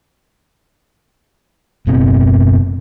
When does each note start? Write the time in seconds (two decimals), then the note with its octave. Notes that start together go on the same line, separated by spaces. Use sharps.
1.87 F#1 B2 C4